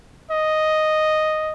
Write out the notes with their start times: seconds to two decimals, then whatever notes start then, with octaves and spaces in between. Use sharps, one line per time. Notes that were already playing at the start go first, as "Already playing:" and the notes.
0.31 D#5